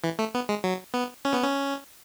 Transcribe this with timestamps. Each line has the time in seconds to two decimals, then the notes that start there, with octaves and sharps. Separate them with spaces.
0.04 E3
0.19 A3
0.34 B3
0.49 G#3
0.64 F#3
0.94 B3
1.25 C#4
1.34 B3
1.44 C#4